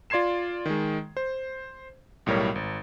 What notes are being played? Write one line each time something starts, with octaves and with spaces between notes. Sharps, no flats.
F4 D5 C6 G#6 C7 E7
D#3 G#3
C5
B1 A2 G3 A#4 C#5
G#1